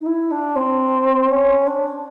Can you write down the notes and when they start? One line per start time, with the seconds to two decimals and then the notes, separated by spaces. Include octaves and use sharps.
0.01 D#4
0.06 E4
0.31 D4
0.56 C4
1.30 C#4
1.67 D4